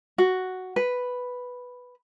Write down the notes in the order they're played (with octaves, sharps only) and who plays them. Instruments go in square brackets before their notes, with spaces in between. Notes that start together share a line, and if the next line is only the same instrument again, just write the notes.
[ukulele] F#4
B4